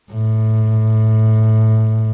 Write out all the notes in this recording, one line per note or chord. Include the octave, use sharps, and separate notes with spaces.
A2